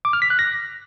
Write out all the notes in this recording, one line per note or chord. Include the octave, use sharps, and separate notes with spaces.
D6
F6
B6
F#6
A#6